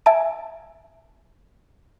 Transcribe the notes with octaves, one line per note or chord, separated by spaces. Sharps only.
E5 G#5 A5 D7